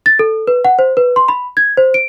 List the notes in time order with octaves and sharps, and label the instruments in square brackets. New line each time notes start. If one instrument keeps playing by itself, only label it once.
[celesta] A6
A4
B4
F#5
C5
B4
C6
B5
G#6
C5
D7